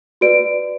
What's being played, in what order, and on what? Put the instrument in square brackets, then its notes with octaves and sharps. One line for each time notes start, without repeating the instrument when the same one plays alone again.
[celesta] F#4 B4 D5 D7